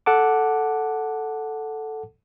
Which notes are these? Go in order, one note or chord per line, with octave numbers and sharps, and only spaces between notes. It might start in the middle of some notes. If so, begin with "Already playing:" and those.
A4 F#5 A5 D6